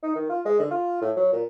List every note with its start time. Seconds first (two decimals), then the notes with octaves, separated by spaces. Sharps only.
0.03 D#4
0.15 D#3
0.30 F4
0.45 G#3
0.60 D3
0.71 F4
1.02 A2
1.17 F#3
1.33 A#2